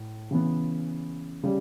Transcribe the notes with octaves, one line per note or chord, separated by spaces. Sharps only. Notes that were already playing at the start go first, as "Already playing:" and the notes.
Already playing: A2
C#3 E3 B3
C#3 G3